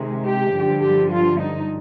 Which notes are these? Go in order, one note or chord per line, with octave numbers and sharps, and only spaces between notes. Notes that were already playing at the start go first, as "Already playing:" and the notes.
Already playing: C3 D#3 G#3
G4
G2 D3 F3
G4
F4
D#4